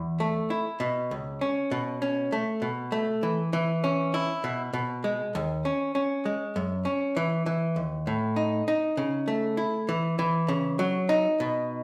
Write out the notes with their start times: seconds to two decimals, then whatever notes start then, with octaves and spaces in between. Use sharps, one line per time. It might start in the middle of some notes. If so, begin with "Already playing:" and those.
Already playing: E2
0.20 A3
0.50 E4
0.80 B2
1.11 C#2
1.41 C#4
1.71 B2
2.02 C#4
2.32 A3
2.62 B2
2.92 A3
3.23 E3
3.53 E3
3.84 C#4
4.14 E4
4.44 B2
4.73 B2
5.04 G#3
5.35 D#2
5.65 C#4
5.95 C#4
6.25 G#3
6.56 F#2
6.85 C#4
7.17 E3
7.46 E3
7.76 D#2
8.07 A2
8.36 D#4
8.68 D#4
8.97 C#3
9.28 A3
9.57 E4
9.89 E3
10.19 E3
10.48 C#3
10.79 F#3
11.09 D#4
11.40 B2